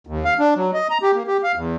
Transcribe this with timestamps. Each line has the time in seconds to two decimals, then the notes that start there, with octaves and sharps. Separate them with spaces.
0.07 D#2
0.25 F5
0.39 D4
0.56 F#3
0.74 D#5
0.90 A#5
1.03 G4
1.15 A#3
1.27 G4
1.43 F5
1.55 E2